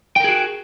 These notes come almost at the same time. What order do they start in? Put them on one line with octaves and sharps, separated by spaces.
G5 A#4 G#4 F#4